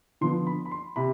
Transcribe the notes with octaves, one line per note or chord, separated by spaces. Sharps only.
D3 F3 B3 C6
B5
B5
C6
C3 B5